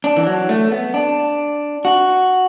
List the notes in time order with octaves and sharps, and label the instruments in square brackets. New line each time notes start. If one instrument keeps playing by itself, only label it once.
[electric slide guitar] D4
E3
F#3
A3
B3
D4
F#4